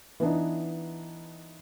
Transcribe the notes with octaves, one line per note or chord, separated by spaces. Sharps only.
E3 B3 D4 D#4